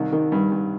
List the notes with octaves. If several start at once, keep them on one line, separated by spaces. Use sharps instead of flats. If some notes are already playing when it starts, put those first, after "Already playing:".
Already playing: C2 D#3
D#3
G2
G2